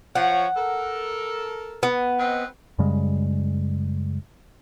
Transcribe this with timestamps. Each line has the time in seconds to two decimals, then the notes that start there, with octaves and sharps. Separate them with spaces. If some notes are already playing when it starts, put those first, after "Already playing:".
0.15 F3 C#5 F#5
0.55 A4 A#4
1.83 B3
2.19 C4 B4 D#5
2.79 F#2 C#3 G3 G#3